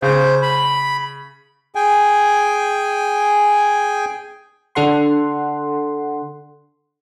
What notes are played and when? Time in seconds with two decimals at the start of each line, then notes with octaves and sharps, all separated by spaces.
0.02 C#3 C5
0.42 B5
1.75 G#4 G5 G#5
4.75 D3 D4 A4 F#5 C6